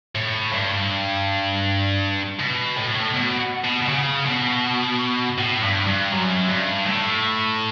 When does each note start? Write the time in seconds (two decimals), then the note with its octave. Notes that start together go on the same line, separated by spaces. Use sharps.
0.15 A2
0.52 G2
2.39 B2
2.76 A2
3.14 B2
3.64 B2
3.82 B2
3.88 C#3
4.26 B2
5.38 A2
5.62 G2
5.87 G2
6.12 F#2
6.49 G2
6.87 A2